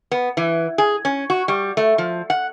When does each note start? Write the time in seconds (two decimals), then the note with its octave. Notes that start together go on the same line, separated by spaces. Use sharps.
0.11 B3
0.37 E3
0.78 G#4
1.05 C#4
1.30 F#4
1.48 G3
1.77 A3
1.98 F3
2.30 F#5